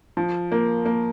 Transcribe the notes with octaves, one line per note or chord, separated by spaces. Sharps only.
F3
A#3
A#3